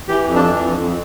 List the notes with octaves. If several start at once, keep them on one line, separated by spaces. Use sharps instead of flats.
E3 G4
F2
D4
E3
F2
F2